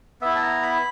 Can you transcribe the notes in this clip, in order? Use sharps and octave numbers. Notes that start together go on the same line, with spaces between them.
B3 E4 E5
A5
A#5
B5